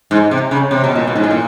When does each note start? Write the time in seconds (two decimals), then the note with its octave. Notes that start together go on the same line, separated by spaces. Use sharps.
0.11 G#2
0.31 C3
0.51 C#3
0.71 C3
0.84 B2
0.95 A#2
1.07 B2
1.16 G#2
1.24 A2
1.31 A#2